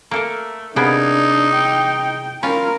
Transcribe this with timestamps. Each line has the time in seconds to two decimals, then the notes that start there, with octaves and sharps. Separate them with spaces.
0.11 A3 A#3 A4 A#4 A#5
0.76 C3 A#3 B3 D4 D#4 G#4 G#6
1.55 G5
2.43 C#4 F4 A#4 A#5 B5